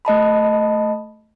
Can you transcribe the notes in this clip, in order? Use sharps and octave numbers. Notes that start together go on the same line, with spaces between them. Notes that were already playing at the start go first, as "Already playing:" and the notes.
A3 D#5 A5 B5